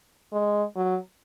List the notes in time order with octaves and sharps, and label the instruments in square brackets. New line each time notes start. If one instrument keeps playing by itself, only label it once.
[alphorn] G#3
F#3